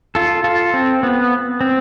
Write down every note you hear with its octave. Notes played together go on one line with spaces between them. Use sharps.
F4 A4
F4 A4
C4
B3
C4